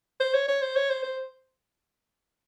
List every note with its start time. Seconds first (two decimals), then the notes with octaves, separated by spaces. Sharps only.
0.20 C5
0.34 C#5
0.48 C#5
0.62 C5
0.76 C#5
0.90 C5
1.03 C5